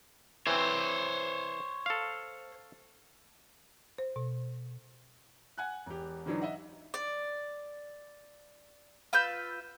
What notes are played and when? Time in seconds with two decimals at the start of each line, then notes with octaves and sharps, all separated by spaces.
0.47 E3 C4 C5 C#5
1.86 A4 F5
3.98 C5
4.16 B2
5.58 F#5 G#5 F#6
5.86 E1 G4
6.26 G#2 D3 E3 F#3 D4 D#4
6.42 D#5 E5 F#5
6.94 D5
9.13 F4 B4 E6 G6